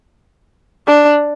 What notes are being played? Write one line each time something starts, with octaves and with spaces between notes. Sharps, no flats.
D4